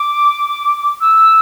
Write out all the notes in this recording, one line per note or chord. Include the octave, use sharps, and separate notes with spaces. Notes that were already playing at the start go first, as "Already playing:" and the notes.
Already playing: D6
E6